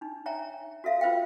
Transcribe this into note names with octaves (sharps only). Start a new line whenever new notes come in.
D4 D#4
C#5 E5 G5 G#5 A#5
F#4 A4 E5 F5
F4 B4 C5 E5 F5 G5